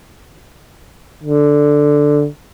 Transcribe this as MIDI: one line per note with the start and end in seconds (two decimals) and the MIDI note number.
1.24 2.27 50